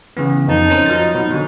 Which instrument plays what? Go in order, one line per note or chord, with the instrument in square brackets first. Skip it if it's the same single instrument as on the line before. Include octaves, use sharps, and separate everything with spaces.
[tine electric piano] C#3 E3 B3
[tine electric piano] F2 A5 [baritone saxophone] D#4
[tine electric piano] C#4 A#4 C5
F3 F#3 A6
B2
D3 F#3